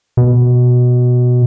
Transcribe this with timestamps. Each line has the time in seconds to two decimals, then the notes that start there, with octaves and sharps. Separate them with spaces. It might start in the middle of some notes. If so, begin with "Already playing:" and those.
0.17 B2